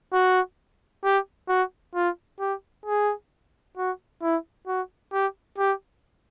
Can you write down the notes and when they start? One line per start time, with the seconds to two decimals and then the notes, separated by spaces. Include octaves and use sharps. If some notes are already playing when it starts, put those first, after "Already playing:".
0.13 F#4
1.04 G4
1.49 F#4
1.95 F4
2.40 G4
2.86 G#4
3.77 F#4
4.22 E4
4.68 F#4
5.13 G4
5.58 G4